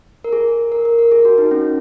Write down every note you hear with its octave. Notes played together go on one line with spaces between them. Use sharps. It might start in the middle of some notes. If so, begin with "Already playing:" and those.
A#4
G#4
A#4
A#4
A#4
G#4
F#4
D#4
C#4